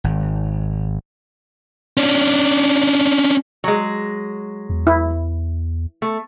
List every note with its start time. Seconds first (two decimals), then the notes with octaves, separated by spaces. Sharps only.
0.04 G#1
1.97 C#4 D4
3.64 F#3 G#3
4.70 E2
4.87 E4
6.02 A3